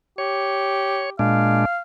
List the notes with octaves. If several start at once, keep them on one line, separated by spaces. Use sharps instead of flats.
G4 C#5
A#2 G#3 D4 F5